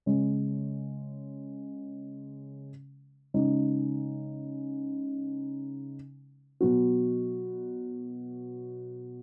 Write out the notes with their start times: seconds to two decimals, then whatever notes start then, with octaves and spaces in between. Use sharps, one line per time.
0.06 C#3 G#3 C#4
3.34 C#3 G#3 D#4
6.61 B2 F#3 B3 F#4